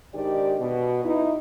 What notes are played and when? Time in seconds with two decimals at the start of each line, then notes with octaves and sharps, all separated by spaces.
0.13 G#2 D#3 D4 G4 D5
0.59 B2
1.04 D#4 E4